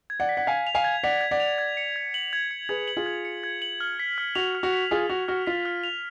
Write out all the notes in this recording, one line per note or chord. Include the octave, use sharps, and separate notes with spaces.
G#6
D5 F#5
B6
F#5
F5 G#5 G#6
F7
F5 G#5
G#6
D5 F#5 B6
G#6
D5 F#5
F7
G#6
C#7
G#6
F#7
G#6
C#7
G#4 B4 G#6
F#7
F4 G#4
G#6
C#7
G#6
F#7
F6
B6
F6
F#4 F7
F6
F#4
B6
F4 G#4 F6
F#4 F7
F#4 F6
F4 B6
F6
F7